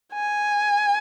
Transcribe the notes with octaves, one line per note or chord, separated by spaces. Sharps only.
G#5